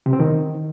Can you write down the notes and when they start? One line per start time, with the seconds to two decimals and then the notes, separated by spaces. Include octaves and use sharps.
0.06 C3
0.13 C4
0.20 D#3